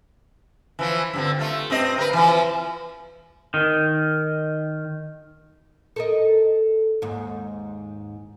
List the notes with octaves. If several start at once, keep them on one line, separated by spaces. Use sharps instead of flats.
E3 F3
G2 D3 C4
A3 F4
G2 C4 D#5
A#4 B4
E3 F3
D#3
A4 A#4 D#5
D#2 G#2